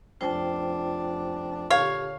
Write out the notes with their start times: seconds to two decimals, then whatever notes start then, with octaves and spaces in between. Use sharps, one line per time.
0.21 F1 D4 F4 C5 G5
1.70 A#2 D3 G4 C#5 F5